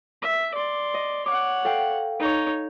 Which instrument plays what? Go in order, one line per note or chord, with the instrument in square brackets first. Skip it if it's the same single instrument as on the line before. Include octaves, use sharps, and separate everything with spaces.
[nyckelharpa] E5
D5 C6
[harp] D#5
[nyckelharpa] C#5 F#5 [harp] D6
[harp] A4 F5 G5
[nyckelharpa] D#4 C#5